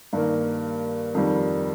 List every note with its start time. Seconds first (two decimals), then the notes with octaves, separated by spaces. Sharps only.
0.13 G2 D#3 A#3
1.15 F2 D#3 G3